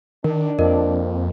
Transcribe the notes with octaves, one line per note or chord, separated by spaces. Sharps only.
D#3 D4 A#4
F2 F3 A#3 C4 A#4 D#5